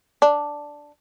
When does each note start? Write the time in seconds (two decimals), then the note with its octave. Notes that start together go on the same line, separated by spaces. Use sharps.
0.22 D4